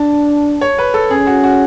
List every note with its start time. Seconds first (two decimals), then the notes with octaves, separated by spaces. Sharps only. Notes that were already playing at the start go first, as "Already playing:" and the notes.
Already playing: D4 A5
0.61 C#5
0.78 B4
0.94 A4
1.10 C#4 G#4
1.27 F#4
1.44 F#4